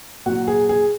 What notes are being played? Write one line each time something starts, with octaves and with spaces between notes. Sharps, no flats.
A#2 F#3 F#4
G#4
G#4